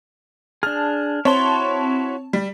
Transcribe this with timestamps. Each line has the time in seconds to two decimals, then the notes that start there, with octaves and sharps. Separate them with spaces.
0.63 D4 G#4 A5 F6
1.25 C4 E4 F#4 C#5 A5 C6
2.33 G3